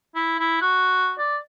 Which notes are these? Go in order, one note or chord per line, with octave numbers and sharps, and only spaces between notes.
E4
E4
F#4
D5